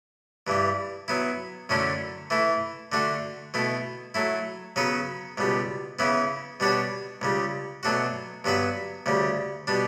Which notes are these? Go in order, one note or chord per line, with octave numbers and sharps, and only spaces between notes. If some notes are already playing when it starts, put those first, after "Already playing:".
G2 E3 G3
F#3 B3 E4
F#2 D3 A3 C#4 E4
E3 A3 E4
D3 A3 D4 F#4
B2 A3 E4
F#3 A3 E4
C#3 F#3 B3 F#4 B4
C#2 B2 G3
C#3 E3 B3 E4
B2 G3 D4 F#4 C#5
C#2 C#3 G3
B2 F#3 A3 D4 F#4
G2 F#3 B3 F#4 B4
D2 C#3 G3
B2 G3 D4